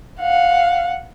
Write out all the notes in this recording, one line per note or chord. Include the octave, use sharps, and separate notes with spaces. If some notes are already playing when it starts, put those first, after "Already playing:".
F5 F#5